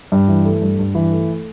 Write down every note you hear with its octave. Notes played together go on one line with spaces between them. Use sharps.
G2
E3
A3
G2
G2
E3
A3